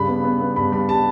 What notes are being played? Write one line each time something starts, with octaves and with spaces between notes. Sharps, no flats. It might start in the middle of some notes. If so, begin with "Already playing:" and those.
Already playing: G2 C#3 B5
B3
B3
B3
G2 B5
G3 B5
G3 A5